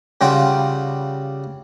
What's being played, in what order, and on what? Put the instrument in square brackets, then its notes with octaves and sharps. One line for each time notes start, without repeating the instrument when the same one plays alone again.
[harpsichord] C#3 G3 F4 F#4 G5